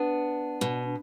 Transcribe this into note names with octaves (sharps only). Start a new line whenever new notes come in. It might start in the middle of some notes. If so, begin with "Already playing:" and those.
Already playing: B3 D4
B2